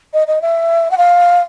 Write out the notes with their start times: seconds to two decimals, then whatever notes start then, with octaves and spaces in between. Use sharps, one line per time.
0.13 D#5
0.27 D#5
0.42 E5
0.91 F#5
0.98 F5